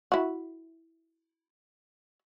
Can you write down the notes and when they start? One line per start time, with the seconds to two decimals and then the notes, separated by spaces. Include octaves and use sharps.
0.12 E4 F#4